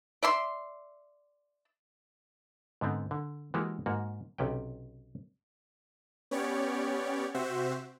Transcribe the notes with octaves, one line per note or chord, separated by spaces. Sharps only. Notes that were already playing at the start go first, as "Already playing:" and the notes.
D5 E5 C6
G#2 D3 B3 C4
D3
E3 G#3 A#3 F#4 G4
G#2 A#3 F#4
B1 C3 C#4 B4 G5
B3 C#4 G4 C#5 D5
C3 C4 F#4 C5 E5